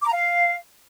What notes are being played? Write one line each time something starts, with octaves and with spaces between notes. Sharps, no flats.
D6
A#5
F5